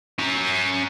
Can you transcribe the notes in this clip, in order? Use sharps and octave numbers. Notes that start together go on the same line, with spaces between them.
C#4 A#5